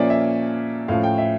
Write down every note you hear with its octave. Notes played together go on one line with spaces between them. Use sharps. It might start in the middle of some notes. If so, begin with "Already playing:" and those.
Already playing: A#2 F3 A#3 C#4 D5 E5
E5
A2 F3 C#4 F5
G5
E5